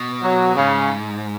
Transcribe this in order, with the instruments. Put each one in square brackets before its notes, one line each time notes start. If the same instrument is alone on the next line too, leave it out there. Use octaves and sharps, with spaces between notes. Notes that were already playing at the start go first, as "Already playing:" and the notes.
Already playing: [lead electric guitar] B2
[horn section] F#3
[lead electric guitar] G#2 [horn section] C#3